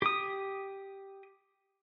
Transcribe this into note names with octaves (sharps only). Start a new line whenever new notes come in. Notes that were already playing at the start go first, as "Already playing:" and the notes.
G4 D#6